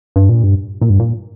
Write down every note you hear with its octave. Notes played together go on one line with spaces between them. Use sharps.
G2
A#2
G2
A#2
G2
A#2